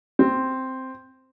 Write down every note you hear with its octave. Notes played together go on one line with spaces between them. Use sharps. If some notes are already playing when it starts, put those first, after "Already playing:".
C4